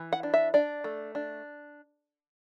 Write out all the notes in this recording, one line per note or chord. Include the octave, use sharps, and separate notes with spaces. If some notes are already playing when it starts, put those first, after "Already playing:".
Already playing: E3
F#5
D4
E5
D4 D5
A3
D4